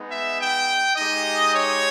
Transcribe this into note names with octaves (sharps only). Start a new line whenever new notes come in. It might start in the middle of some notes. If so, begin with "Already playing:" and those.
Already playing: G#3 B3 D#4
E5
G5
G#3 D#4 G4 D#5
C#5